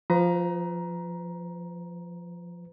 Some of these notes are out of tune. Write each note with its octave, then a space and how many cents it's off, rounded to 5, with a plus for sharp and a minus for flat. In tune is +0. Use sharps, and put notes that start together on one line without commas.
F3 +0 B4 +40 A#5 +15